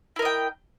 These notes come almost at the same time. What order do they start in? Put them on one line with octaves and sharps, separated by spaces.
E4 A#4 D#5 G5